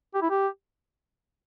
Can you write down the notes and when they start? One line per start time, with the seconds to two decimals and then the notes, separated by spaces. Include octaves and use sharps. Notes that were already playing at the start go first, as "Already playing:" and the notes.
0.14 G4
0.22 E4
0.30 G4